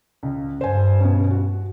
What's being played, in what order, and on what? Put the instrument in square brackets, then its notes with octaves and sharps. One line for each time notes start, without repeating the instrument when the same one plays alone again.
[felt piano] C#2
[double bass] G2 [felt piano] C5 G#5
[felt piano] B2 C#4
F#4